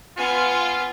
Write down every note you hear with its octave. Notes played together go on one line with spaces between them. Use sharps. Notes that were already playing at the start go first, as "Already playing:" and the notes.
B3 F4 G#5